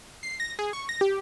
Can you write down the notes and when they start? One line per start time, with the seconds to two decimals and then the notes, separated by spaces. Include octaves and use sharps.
0.23 C7
0.40 A#6
0.59 G#4
0.73 C#6
0.89 A#6
1.01 G4